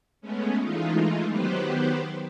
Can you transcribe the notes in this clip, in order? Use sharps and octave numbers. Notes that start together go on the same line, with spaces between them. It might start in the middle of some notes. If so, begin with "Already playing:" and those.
G#3 A3 B3 C#4
E3 G#3 A3 D#4 F4
D#3 F#3 B3 G4 B4 C5